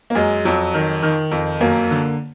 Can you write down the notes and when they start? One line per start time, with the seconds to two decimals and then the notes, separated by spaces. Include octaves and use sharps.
0.10 A#3
0.15 F#2 G#3
0.45 F2 F#3
0.74 D#3
1.02 D#3
1.31 F2
1.60 F#2 A#3
1.91 D3